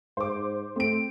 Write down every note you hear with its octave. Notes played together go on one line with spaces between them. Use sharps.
G#2 C5 D6
A3 C4 D7